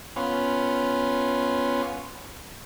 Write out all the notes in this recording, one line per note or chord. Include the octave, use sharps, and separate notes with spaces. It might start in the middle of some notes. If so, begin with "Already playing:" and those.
B3 C#4 F4